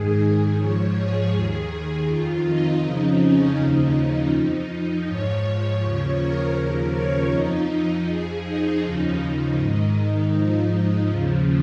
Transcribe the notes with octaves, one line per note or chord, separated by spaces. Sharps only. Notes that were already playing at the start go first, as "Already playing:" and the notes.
Already playing: G#2 D#3 G#4
G#4
G#2 F3 C#5
G#4
D#2 D#3
F2 D#3 F4
D#4
F2 C#3 F3
C#4
D#2 C#3 F3 D#4
F2 F3 D#4
G#2 F3 C#5
D#2 C#3 F3 C#5
A#4
D#2 C#3 F3
C#5
F2 F3 D#4
F2 F3 G#4
D#4
D#2 C#3 F3
D#4
G#2 D#3
G#2 F3 D#4
D#2 C#3 F3